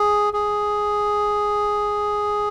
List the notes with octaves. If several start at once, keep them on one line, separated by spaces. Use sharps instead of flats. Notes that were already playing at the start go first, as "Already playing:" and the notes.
Already playing: G#4
G#4